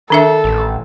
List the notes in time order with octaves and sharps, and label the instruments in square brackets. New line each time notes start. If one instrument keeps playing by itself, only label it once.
[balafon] D#3 D4 E5 [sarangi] A4
[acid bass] A1